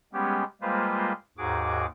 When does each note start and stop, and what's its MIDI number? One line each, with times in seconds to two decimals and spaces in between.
0.13 0.44 55
0.13 0.44 56
0.13 0.44 59
0.13 0.44 61
0.13 0.44 67
0.62 1.12 55
0.62 1.12 56
0.62 1.12 58
0.62 1.12 65
0.62 1.12 71
0.62 1.12 72
1.38 1.86 39
1.38 1.86 44
1.38 1.86 66
1.38 1.86 68
1.38 1.86 86